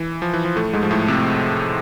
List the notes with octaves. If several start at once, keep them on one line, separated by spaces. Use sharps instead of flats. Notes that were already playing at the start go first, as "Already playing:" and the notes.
Already playing: E3
F3
E3
F3
A2 A3
G#2 G#3
F3
A2 A3
C3 C4